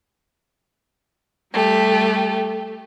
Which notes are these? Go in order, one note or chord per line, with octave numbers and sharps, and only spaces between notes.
G3 A3 G4